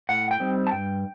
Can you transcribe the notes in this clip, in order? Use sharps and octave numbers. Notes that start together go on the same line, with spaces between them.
A2 F#5
G5
G3 C4 D#4
A5
G2 G5